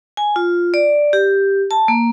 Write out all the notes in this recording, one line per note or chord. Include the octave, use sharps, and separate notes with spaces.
G#5
F4
D5
G4
A5
A#3